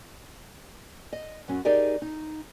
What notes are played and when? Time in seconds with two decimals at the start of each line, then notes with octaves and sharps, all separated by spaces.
1.13 D#5
1.48 F#2 F#3 C#4
1.65 D#4 G4 G#4 A#4 D5 D#5
2.02 D#4